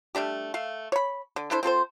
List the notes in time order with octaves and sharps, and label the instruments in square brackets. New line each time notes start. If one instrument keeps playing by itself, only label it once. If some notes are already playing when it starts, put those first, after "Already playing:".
[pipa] G3 A3 D4 G4
A3 F5
C#5 B5
D3
D4 E4 A4 C5
C4 F4 A4 C5